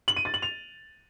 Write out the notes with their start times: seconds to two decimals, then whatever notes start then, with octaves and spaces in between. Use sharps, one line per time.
0.08 F#7
0.16 D#7
0.25 A6
0.34 F#7
0.42 F7